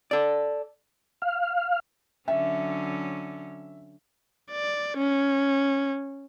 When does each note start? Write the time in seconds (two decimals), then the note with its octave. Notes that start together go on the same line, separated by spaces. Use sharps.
0.11 A4 D5
1.22 F5
2.28 D3 F#3 C#4 E5
4.52 D5
4.98 C#4